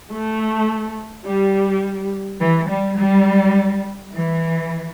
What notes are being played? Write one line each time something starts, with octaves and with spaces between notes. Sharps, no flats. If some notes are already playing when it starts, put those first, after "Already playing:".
A3
G3
E3
G3
G3
E3